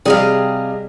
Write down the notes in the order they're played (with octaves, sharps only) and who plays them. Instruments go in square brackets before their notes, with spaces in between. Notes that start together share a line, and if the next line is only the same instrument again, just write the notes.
[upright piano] C3 G3 [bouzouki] G#4 D#5 F5